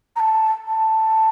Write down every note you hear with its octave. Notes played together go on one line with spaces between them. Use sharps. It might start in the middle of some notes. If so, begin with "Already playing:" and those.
A#5
A5
A5